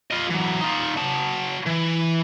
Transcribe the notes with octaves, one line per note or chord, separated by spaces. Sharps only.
F4 D#5
E3 F#3
D#4 F4
F#3 A5
E3